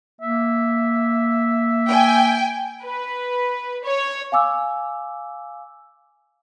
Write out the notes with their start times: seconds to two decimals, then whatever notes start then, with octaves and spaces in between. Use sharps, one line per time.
0.21 A#3 E5
1.88 G5 G#5
2.83 B4
3.84 C#5
4.32 F5 G#5 D6 E6